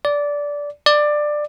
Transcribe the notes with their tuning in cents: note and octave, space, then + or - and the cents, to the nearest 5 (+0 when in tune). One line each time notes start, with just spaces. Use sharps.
D5 -15
D5 +15